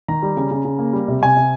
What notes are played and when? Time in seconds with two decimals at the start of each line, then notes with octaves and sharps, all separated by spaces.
0.08 D#3 A#5
0.22 G3
0.37 C#3
0.51 C#3
0.65 C#3
0.79 A#3
0.93 G3
1.08 C3
1.22 C3 G#5
1.37 C3